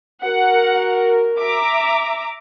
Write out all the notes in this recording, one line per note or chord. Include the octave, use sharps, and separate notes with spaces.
F#4 A#4 F#5
E5 A#5 D6